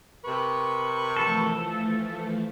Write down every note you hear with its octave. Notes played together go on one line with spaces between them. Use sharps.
C3 A#4 B4 C#6
E3 F3 A3 A4